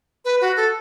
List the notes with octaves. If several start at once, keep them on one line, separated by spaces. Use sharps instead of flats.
B4
F#4
A4